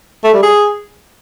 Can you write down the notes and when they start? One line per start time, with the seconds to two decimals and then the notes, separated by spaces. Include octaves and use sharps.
0.24 A3
0.33 G3
0.43 G#4